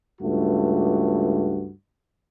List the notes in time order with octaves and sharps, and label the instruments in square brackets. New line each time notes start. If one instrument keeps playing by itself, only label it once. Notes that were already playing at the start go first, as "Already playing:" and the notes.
[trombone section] C#2 G2 A3 F#4